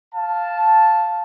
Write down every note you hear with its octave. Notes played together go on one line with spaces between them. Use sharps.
F5 A5